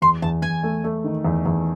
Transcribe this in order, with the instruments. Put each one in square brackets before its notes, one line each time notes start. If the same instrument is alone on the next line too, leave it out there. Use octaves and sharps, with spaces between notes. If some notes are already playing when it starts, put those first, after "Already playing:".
[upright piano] E2 [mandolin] C6
[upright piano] E2 [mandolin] A5
[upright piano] E2 [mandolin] G#5
[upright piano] A3
A3
D#3
E2
E2